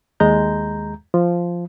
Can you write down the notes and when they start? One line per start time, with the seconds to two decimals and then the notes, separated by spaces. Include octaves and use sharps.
0.20 D#2 G#3 A#5 G6
1.14 F3